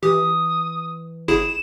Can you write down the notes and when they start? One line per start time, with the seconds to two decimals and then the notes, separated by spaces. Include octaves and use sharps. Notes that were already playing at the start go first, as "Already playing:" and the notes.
0.03 E3 G4 D#6
1.28 G1 E4 G#4 E7